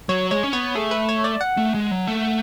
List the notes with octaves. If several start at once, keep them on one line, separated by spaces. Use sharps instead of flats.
F#3 C#5
G#3 C#5
C#4
B3 C#5
A3 G#4
B4
C#5
D5
F#5
A3
G#3
F#3
A3